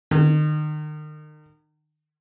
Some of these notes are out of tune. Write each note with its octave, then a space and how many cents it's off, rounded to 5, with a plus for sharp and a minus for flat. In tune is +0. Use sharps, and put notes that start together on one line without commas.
D#3 -35